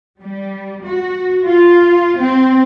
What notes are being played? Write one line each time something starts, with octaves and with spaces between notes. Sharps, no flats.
G3
F#4
F4
C4